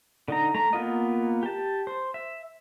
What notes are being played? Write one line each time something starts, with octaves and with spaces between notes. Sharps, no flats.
D3 D#4 A#5
A3 A#5
A#3 B3 F4 D#5
G4 A5
C5
E5